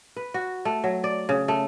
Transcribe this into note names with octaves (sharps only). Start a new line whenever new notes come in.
B4
F#4
A3
F#3
D5
C#3
A3